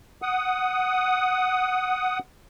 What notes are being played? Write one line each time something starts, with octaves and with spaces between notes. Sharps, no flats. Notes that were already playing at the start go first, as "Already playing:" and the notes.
F#5 D#6